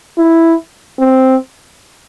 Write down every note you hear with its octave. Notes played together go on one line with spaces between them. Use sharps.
E4
C4